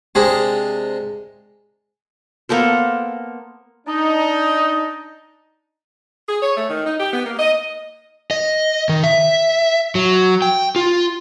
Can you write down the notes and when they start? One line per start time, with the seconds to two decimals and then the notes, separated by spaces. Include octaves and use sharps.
0.15 C3 G#3 D4 G#4
2.49 A#3 B3 A4 C5
3.86 D4 D#4
6.29 G#4
6.42 C#5
6.56 A3
6.69 D#3
6.85 D#4
7.00 G4
7.13 B3
7.25 A#3
7.38 D#5
8.31 D#5
8.89 D#3
9.03 E5
9.95 F#3
10.42 G5
10.76 F4